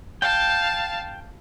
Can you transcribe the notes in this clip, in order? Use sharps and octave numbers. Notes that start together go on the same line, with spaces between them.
F5 G5 A5